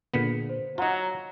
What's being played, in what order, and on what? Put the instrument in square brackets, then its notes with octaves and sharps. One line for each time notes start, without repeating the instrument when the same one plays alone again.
[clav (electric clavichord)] A#2 D3 B3 [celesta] G#4 B6 C#7
[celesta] C5
[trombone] F#3 [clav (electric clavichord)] D#4 F4 [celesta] F#5 A#5